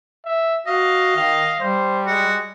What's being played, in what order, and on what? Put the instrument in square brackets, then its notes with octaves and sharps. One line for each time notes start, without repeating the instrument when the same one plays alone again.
[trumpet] E5
[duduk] F#4 [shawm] D#5 [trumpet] F5
[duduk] D#3 [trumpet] F5
[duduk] G3 [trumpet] C5
[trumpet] G#3 [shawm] F#4